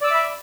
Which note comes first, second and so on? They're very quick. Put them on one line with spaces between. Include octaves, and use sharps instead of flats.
D5 E6 D6 E5 B5